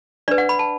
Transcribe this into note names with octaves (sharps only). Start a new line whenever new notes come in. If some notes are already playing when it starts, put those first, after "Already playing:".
D4 B4 D5
F#5
B5
A5